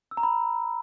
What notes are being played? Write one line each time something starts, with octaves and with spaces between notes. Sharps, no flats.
E6
A#5
B5